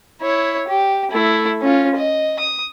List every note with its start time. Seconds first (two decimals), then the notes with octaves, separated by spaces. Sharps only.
0.21 E4 C#5
0.68 G4
1.11 A3 E4
1.61 C#4 F4
1.95 D#5
2.39 D#6